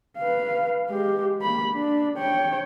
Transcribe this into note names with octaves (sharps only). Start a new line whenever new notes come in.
B4 F5
G#3 G4
A#3 B5
D4
C#5 G5